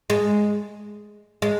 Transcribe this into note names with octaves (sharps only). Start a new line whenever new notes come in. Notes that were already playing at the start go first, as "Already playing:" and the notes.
G#3
G#3